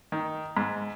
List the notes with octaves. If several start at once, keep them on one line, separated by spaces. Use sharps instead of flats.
D#3
G#2